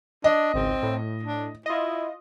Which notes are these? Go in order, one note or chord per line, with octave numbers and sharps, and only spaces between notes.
D4 D#5
G#1 C#2 C4
A2
D4
E4 F4 D#5